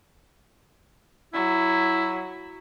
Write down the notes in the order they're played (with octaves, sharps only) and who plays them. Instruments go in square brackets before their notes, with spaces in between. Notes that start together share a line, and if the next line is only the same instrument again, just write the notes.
[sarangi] F#3 [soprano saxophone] E4